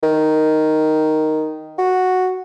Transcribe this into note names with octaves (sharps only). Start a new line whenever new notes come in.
D#3
F#4